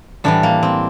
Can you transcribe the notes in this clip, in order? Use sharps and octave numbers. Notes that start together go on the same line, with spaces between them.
A2 E3 G3 D4
A#3
C4